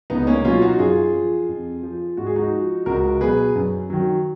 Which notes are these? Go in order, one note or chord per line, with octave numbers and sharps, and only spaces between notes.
C#2 B3 D#4
A#3 C#4
B2 F#3 C#4 F4
D#4 F#4
F#2 F4 G#4
F3
F2
F3
G#2 F#4
G#4
D#4 F#4
F3
C#2 F#4 A#4
B2 F#3 G#4 B4
F#2
D#3 F#3